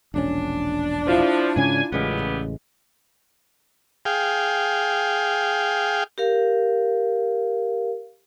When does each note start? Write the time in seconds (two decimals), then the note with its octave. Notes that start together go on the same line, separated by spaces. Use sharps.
0.14 E1 A#1 C#4 D4
1.07 F3 E4 F4 C5
1.56 G#2 C#3 C#4 G#5
1.92 A1 A#2 C#3 G#3 B3 G4
4.05 G#4 F5 G5
6.18 G4 A#4 F5